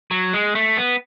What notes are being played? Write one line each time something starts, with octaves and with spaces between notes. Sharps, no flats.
F#3
G#3
A3
B3